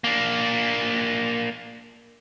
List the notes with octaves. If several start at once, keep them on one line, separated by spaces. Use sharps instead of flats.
A#3 D4